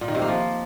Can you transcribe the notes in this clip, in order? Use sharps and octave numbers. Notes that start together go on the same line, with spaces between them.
A#2
D#3
C3
A#3
F3